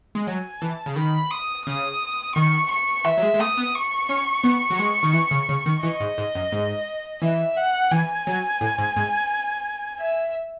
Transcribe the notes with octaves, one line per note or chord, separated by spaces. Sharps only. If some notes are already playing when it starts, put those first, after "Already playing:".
G#3
F#3 G#5
E3 A5
C#3
D#3 B5
D#6
C#3 D#6
D#3 C#6
C#6
E3 E5
F#3
G#3
G#3
A3 D#6
B3
C#6
C#4
B3
F#3
G#3
D#3
E3
C#3
C#3
D#3
E3 D#5
G#2
G#2
F#2
G#2
E3 E5
F#5
E3 G#5
F#3
A2
G#2
G#2
E5